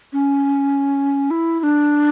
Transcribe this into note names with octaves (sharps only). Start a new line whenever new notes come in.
C#4
E4
E4
D4